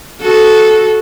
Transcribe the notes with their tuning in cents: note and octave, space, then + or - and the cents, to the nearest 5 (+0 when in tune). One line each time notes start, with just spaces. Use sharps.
F#4 -5 A4 -15